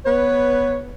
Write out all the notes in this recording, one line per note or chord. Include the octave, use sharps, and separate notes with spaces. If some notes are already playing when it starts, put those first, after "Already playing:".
B3 B4 C#5